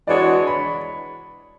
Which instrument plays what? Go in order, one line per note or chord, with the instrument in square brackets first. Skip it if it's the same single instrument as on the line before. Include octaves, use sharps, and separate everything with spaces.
[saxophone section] E3 G#3 D4 F#4 C#5 [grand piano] D5
[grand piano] B5